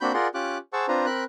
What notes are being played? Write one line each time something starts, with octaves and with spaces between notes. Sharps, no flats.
A#3 C4 D4 F#4 B5 G6
F4 G#4 A#4 D5 F#5 C6
C#4 F4 G4 D6 F#6
G#4 C5 F#5 A5 C#6 E6
C4 D4 F4 B4 C5 A#5
C4 A#4 B5 F#6